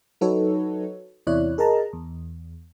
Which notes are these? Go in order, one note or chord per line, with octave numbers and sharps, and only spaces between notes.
F#3 D#4 F#4 A4 B4 C#5
E2 C3 E4 C#5 D5 F#6
G#4 A#4 D#5 A5 A#5
E2